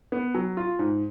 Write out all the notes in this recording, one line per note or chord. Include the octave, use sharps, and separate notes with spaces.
B3
F#3
F4
G#2